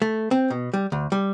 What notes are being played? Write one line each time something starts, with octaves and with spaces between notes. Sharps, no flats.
A3
C4
B2
G3
D2
G3